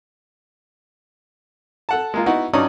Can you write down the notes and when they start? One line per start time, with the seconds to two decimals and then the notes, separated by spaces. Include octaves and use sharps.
1.89 A4 F#5 A5
2.14 G#3 A#3 F4
2.26 B3 D#4 E4 F#4
2.53 G2 F#3 C#4 D#4 D5 D#6